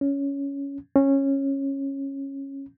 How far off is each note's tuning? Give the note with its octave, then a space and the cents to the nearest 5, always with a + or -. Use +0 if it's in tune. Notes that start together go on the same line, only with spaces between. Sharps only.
C#4 +10
C#4 -15